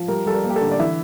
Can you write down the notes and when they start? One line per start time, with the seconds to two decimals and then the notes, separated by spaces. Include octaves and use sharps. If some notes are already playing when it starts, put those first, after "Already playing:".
Already playing: F3
0.08 G3 A#4
0.26 G3 A4
0.32 A#4
0.44 A#3
0.50 G4
0.56 A4
0.61 D3
0.71 D5
0.79 E3 E5